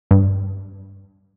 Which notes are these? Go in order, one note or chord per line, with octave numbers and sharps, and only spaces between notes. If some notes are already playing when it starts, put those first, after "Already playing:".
G2